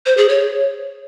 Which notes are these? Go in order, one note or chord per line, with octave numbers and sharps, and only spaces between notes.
C5
G#4
C#5